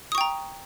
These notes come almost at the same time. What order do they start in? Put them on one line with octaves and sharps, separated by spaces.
D#6 C#6 G5 A#5